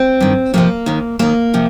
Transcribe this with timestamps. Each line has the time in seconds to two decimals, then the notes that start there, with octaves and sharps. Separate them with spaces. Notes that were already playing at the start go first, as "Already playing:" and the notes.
Already playing: C4
0.21 G2 D#3
0.54 F2 C3 F3 A#3
0.86 D#2 D#3
1.19 D#2 D#3 A#3
1.54 C3 F3